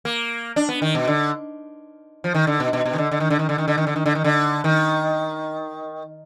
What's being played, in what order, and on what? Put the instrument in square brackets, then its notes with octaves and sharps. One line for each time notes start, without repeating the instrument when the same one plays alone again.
[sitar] A#3
D4
B3
D#3
B2
D3
F3
D#3
D3
B2
B2
B2
D#3
D3
D3
D#3
D3
D#3
D3
D#3
D3
D#3
D3
D#3
D3
D#3
D3
D#3